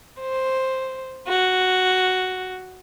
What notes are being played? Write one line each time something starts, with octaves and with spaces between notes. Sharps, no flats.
C5
F#4